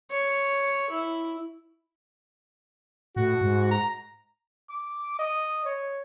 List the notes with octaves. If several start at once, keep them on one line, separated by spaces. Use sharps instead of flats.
C#5
E4
A2 F#4
G#2
A#5
D6
D#5
C#5